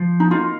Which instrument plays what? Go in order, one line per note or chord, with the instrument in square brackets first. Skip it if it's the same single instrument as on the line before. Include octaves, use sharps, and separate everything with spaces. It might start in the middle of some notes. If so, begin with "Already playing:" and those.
Already playing: [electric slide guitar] F3
[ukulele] D#4
[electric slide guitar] A#3 D#4 [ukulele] F4